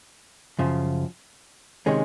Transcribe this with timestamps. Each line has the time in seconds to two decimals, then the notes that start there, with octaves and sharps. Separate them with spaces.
0.59 F#2 C#3 F3
1.86 C3 D#3 G#3 C#4